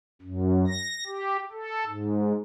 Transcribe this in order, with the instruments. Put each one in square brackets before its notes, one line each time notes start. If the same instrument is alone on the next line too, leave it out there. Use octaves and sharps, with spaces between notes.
[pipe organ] F#2
A#6
G4
A4
G#2